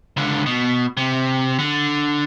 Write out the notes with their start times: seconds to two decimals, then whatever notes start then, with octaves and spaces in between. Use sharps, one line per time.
0.17 C#2 D3
0.46 B2
0.97 C3
1.59 D3